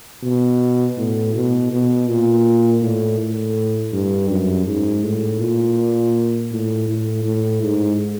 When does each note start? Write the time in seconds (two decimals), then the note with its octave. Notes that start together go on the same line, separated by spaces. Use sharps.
0.23 B2
0.97 A2
1.35 B2
1.72 B2
2.08 A#2
2.82 A2
3.19 A2
3.93 G2
4.30 F#2
4.67 G#2
5.03 A2
5.40 A#2
6.52 A2
6.89 A2
7.25 A2
7.62 G#2